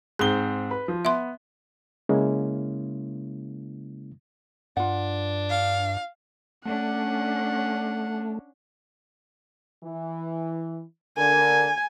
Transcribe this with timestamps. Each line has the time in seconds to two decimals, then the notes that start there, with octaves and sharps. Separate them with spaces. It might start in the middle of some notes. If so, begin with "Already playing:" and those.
0.19 G#2 C4 G#4 G7
0.71 B4
0.88 F3
1.05 B3 E5 C6
2.09 C#3 G#3 A#3 C#4 E4
4.77 G2 D4 F4 F#5
5.50 F5
6.65 A3 C#4 D4 F#5
9.84 E3
11.17 D3 A#4 G#5